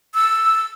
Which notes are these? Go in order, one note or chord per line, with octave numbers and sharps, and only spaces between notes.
E6